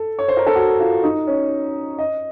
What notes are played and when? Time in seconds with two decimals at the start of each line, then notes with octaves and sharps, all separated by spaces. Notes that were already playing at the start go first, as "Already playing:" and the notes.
Already playing: A4
0.19 C#5
0.28 C5
0.37 A#4
0.47 A4
0.55 F#4
0.80 F4
1.03 D#4
1.27 C#4
1.99 D#5